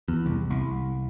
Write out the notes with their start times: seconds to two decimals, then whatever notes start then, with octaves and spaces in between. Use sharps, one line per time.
0.08 E2
0.26 C2
0.50 C2